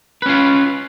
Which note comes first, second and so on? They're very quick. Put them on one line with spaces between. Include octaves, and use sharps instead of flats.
B4 C#4 F4